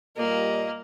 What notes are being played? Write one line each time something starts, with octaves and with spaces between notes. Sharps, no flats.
A#2 G3 A#3 D#5